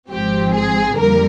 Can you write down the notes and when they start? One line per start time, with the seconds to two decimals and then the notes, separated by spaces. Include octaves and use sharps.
0.10 G#1 G#2 F3 C4 G4
0.54 G#4
0.97 F2 D3 G3 A#3 A#4